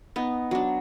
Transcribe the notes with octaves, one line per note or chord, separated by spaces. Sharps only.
B3 D#4
F#3 D4